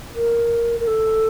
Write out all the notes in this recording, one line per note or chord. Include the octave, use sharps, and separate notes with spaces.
A#4
A#4
A4